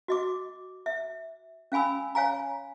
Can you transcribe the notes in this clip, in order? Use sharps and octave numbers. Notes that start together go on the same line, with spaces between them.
F#4 D#5 D6
E5
C#4 F5 G#5 B5 E6
C#5 F5 G#5 A#5